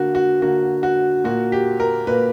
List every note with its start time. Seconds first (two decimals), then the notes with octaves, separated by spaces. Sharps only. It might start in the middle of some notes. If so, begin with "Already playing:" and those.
Already playing: D3 A#3 F#4
0.15 F#4
0.42 D3 A#3 F#4
0.83 F#4
1.24 A#2 A#3 F#4
1.52 G4
1.80 A#4
2.07 A#2 A#3 B4